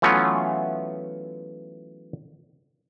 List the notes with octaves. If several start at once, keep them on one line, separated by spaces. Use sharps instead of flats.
E3 F#3 A3 B3 C#4 F4